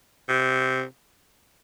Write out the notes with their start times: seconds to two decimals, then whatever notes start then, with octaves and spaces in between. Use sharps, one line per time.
0.29 C3